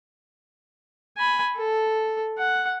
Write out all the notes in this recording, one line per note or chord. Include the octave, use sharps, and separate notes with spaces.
G#5 B5
A4
F#5